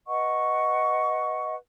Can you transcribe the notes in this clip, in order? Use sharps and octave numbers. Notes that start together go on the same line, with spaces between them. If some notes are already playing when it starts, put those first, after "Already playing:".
B4 D#5 F#5 C#6